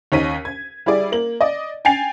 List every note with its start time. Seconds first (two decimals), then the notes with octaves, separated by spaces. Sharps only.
0.12 D#2 C#4 D#4 B6 D#7
0.45 G#6
0.86 G3 E4 G#4 D5
1.12 A#3 F#7
1.41 D5 D#5
1.85 G5 G#5 A6 C7 F7